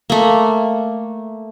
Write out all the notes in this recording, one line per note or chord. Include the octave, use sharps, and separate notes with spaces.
A3 A#3